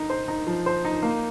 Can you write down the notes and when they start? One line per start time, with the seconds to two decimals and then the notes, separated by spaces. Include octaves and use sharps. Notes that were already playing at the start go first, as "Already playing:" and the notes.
Already playing: D#4
0.10 C5
0.28 D#4
0.47 F3
0.66 C5
0.85 D#4
1.03 A#3